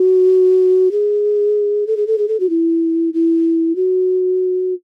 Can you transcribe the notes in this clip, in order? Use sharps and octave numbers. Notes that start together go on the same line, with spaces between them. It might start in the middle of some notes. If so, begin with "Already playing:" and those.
Already playing: F#4
G#4
A4
G#4
A4
G#4
A4
F#4
E4
E4
F#4